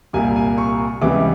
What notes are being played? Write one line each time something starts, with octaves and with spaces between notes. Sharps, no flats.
C2 A#2 G3 A#3 G#5
G#5
C#6
C#2 C3 E3 G3 B3 D6